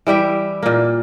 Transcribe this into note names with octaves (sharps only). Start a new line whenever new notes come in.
E3 G3 G4 E5
A#2 A#3